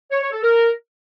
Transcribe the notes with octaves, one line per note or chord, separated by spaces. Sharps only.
C#5
C#5
A4
A#4